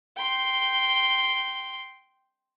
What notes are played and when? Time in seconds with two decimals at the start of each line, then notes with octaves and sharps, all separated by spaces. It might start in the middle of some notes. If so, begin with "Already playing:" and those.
0.17 G5 C6